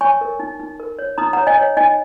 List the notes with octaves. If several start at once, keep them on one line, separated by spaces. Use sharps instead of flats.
C#5 G#5 C#6
A#4
D#4
D#4
A#4
C#5
D#4 A#5 D#6
F#5 A#5
C#5
D#5 G#5
C#5
D#4 D#5 G#5